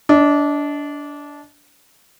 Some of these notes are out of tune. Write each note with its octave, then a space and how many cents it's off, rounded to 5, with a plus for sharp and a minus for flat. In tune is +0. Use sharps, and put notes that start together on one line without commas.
D4 -20 D#5 +20